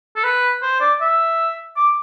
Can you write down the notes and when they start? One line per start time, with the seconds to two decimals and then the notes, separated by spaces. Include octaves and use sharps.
0.16 A4
0.24 B4
0.62 C5
0.80 D5
1.01 E5
1.77 D6